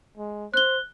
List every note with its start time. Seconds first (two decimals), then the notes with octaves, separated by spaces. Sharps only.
0.17 G#3
0.54 C5 F#6 G7